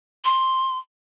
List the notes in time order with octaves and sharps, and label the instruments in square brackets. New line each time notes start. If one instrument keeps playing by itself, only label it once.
[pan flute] C6